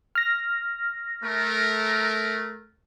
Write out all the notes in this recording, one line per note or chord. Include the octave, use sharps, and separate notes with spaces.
F6 A#6
A3 A#4